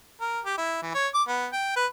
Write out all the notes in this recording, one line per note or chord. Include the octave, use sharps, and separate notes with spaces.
A#4
G4
E4
E3
C#5
D6
B3
G5
B4